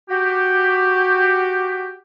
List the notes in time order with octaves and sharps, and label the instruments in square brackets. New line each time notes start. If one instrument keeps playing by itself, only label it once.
[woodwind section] F#4 G4